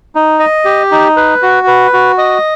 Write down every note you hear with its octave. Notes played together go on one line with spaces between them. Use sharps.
D#4
D#5
G4
D#4
B4
F#4
B4
F#4
D#5